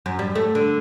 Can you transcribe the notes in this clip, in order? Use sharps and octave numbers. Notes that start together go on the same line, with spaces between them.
F#2
G3
A3
D3